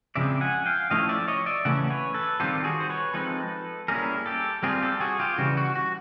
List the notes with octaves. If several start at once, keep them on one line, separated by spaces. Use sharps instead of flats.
C#3 F3 G#3 C4 D5 E5
F#5 G#5
F5 G5
F3 A3 C#4 E4 D#5 F5
D5 E5
C#5 D#5
D5 E5
C#3 E3 A3 C#4 E5 F#5
B4 C#5
A4 B4
D#3 G3 C4 F4 G4 A4
F#4 G#4
C5
B4 C#5
F3 G#3 C4 D#4 A4 B4
G3 A#3 C#4 E4 G#4 A#4
G4 A4
G3 C4 F4 G#4 A#4
G4 A4
F#4 G#4
F4 G4
C#3 E3 G3 F#4
F#4
F#4